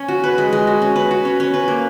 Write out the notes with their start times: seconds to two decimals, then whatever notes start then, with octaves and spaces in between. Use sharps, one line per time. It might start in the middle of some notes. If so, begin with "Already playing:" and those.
Already playing: C#4
0.08 F#4
0.24 B4
0.38 G#3
0.53 G#3
0.67 F#4
0.82 C#4
0.96 B4
1.11 F#4
1.25 C#4
1.40 C#4
1.54 B4
1.68 A#3